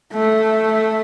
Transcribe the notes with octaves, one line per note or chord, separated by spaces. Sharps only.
A3